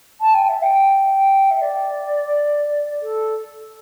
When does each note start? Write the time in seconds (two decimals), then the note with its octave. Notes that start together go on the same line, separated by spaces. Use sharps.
0.21 A5
0.34 G5
0.49 E5
0.62 G5
1.51 E5
1.61 D5
3.02 A4